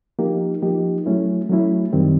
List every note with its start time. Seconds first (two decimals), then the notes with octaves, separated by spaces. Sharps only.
0.19 F3 A#3 D#4 G4
0.62 F3 A#3 D#4 G4
1.06 F#3 A3 C#4 E4
1.49 F#3 A3 C#4 E4
1.93 F#2 D#3 G3 C4